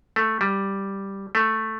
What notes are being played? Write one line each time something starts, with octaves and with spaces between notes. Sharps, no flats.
A3
G3
A3